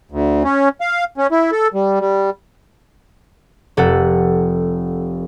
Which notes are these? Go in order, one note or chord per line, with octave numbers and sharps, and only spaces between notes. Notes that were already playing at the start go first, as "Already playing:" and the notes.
D2
C#4
F5
C#4
E4
A4
G3
G3
F1 A4 F#5